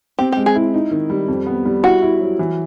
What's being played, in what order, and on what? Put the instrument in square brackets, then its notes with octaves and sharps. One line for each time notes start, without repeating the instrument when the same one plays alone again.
[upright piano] C4 [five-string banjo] G4
[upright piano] G#3 [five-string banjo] G4
[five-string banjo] G#4
[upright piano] E4
D#4
D#3
G3
F2
B3
G3
[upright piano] E4 [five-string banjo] F#4
[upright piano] E4
F#3
E3